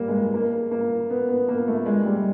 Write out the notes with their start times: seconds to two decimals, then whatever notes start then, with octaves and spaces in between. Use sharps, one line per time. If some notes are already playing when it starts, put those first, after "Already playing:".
Already playing: G3 A#3
0.08 G#3
0.34 A#3
0.71 A#3
1.10 B3
1.29 B3
1.48 A#3
1.68 A3
1.86 G#3
2.05 G3